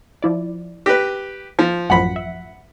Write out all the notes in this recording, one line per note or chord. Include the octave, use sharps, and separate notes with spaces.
F3 E4 D5
G4 B4 A#6
F3
A1 F#2 F3 F#5 B5
E5